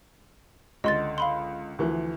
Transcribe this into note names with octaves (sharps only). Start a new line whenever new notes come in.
C#2 D3 D#5 C6 A6
F5 B5 C6
D2 E3 F3